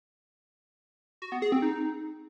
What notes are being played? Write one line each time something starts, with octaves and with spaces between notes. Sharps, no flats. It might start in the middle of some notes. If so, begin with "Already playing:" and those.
F#4
B3
G#4
C4
D#4